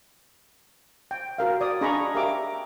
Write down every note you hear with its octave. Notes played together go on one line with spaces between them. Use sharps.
G5
F#4 A#4 F5
D5 D#6
D4 G#4 D#5 A#5 B5 C#6
G4 A#4 E5 F5 A#5 D6